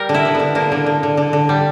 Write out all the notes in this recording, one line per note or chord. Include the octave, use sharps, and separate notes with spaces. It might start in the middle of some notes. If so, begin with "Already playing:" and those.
Already playing: G3 A#4
D3
E4
D3
B3
D3
D3 A#3
D3
D3
D3
D3
D3
G3